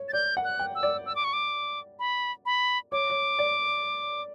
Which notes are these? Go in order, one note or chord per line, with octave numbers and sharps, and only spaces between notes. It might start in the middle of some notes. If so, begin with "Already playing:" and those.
Already playing: C#5
A6
D5 G6
F#5
F#6
G5
E6
D5
E6
D6
C#6
D6
B5
B5
C#5 D6
C#5
D5